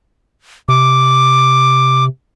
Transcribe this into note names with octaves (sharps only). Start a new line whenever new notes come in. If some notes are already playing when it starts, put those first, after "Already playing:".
C3 D6